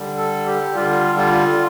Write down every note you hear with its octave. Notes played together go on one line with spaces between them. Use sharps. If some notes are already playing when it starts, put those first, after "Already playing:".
Already playing: D3 G3
A4
G4
D3 G3 F4
F4